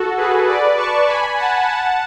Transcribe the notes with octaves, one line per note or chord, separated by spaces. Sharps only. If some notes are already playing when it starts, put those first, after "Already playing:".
Already playing: F#4 A4
G#4 B4
B4 D5
A5 C#6
G#5 B5
F#5 A5
F#5 A5